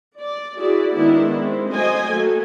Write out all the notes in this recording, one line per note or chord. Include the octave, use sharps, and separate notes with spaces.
D5
E4 F#4 G#4 D5
D#3 G#3 B3 D4 E4
G#3 C4
F#3 A3 C5 D#5 G5 G#5
A3 A#3 F#4 A4